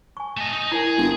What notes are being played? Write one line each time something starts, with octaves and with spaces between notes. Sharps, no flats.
G#5 C#6
A3 D#5
D#4
E4 G#4 A#4 G#5
G1